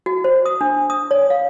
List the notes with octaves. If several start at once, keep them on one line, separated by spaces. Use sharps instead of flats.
F#4
C5
D#6
D4
D#6
C#5
F5